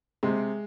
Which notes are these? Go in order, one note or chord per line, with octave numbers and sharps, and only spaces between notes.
C3 G#3